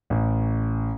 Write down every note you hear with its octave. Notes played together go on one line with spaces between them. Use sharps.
A1